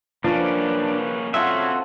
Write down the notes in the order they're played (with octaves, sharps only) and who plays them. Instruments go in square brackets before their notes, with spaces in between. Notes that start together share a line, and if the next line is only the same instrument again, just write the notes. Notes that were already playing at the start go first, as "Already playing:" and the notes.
[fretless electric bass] F3 [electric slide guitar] A#3 C#4 [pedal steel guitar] D4 [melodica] B4
[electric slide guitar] C4 F#4 [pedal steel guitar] C#4 E5 [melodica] F4 A4 F#5